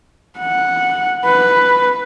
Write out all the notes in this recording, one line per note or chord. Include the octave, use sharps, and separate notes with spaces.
F#5
B4